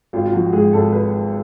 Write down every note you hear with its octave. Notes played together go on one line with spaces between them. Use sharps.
G#1 F4
F4
F3 F#4
F#4
G#2 G#4
G#1 A4
B4